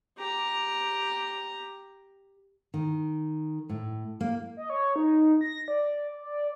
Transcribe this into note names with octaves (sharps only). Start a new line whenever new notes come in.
G4 A#5
D#3
A2
A#3
D#5
C#5
D#4
A#6
D5
D5